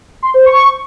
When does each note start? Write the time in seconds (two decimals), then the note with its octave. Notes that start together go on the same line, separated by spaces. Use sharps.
0.23 C6
0.34 C5
0.46 C#6